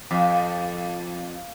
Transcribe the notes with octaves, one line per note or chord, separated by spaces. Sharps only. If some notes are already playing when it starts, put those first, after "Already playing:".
F2